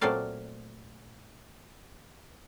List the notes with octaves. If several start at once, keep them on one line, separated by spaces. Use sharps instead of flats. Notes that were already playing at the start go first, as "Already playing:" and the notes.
A#2 F#3 A3 C4 D5 F5